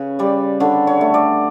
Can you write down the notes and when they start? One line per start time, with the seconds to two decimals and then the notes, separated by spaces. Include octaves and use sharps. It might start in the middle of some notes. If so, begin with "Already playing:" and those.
Already playing: C#3 B4 C#5
0.19 G3 D5
0.60 D3 C#5
0.87 C#5
1.01 A3
1.14 D5